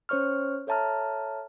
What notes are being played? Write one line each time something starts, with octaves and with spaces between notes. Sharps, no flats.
C#4 C5 C#5 C#6 F6
A4 C#5 E5 A5 A#5 F6